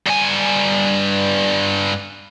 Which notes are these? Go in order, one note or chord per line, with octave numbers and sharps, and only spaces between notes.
G2 G#5